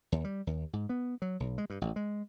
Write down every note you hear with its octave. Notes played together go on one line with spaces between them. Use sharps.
D#2
G3
D#2
G#2
B3
F#3
B1
G#3
G2
A1
G#3